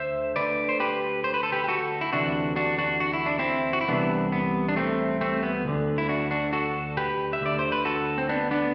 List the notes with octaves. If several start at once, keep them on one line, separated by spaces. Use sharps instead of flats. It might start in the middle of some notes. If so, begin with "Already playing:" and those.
Already playing: D2 D3 C5 E5
D2 D3 B4 D5
C5
G4 B4
C5
B4
A4
G4 B4
G4
F#4 A4
E4
D2 C3 E3 D4 F#4
D4 F#4
D4 F#4
F#4
E4
D4
C4 E4
F#4
E4
C2 C3 E3 B3 D4
B3
D4
A3 C4
A3 C4
B3
D2 D3
E4
D4 F#4
D4 F#4
F#4 A4
G4 B4
E5
D2 D3 D5
C5
B4
F#4 A4
C4
B3 D4
B3 D4